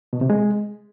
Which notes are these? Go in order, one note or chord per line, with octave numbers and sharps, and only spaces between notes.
B2
C3
G#3